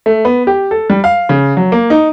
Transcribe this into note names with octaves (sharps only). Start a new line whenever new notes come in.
A3
B3
G4
A4
G3
F5
C#3
F#3
A#3
D#4